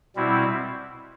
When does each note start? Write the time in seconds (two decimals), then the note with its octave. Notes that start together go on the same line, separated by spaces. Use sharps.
0.16 B2 G3 C4 E4